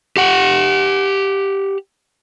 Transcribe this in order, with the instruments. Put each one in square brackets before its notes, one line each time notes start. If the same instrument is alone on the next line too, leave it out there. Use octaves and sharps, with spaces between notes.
[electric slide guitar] G4 F#5